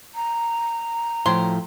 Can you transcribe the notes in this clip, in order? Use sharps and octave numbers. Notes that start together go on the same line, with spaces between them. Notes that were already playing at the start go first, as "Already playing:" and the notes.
A#5
A2 F3 F#3 C5 G5 C6